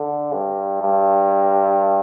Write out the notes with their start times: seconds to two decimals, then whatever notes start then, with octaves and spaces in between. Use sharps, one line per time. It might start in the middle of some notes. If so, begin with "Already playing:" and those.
Already playing: D3
0.33 G2
0.81 G2